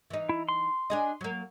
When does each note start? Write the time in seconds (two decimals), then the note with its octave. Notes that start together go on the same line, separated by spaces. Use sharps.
0.10 E3 D#4
0.29 E4
0.49 C6
0.90 D4 G#4 D#5
1.21 F#3 A#3